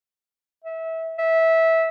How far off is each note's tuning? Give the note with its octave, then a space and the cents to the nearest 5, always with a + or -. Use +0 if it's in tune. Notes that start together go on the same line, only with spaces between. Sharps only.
E5 -25
E5 -15